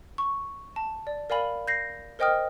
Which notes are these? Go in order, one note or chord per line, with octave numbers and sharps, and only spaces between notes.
C#6
A5
D5
A#4 D5 F5 G#5 B5 F#7
G6 A#6 C7
A#4 C5 D#5 G5 D#6 F6